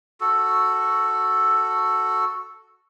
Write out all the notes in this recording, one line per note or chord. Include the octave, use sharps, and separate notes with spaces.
F#4 A4